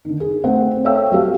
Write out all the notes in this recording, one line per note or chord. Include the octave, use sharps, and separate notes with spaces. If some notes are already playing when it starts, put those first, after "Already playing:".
D3 D#3
G#4
A3 C4 F#5
A4 C#5 E5 F5 G5 E6
F#3 C4 F#4 G4 A4 F5